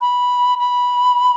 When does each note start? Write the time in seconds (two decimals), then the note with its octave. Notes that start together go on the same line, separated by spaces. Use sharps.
0.01 B5
0.59 B5